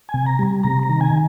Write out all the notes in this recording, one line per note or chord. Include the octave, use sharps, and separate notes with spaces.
G#5
C3
A#5
G3
C3 A#5
A#5
D#3
G#5